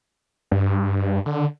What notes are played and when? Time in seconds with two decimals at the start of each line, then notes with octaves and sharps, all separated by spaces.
0.51 G2
1.26 D3